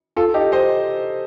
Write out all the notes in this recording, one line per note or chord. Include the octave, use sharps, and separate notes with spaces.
F4 A4
D#4 G4
C5 D#5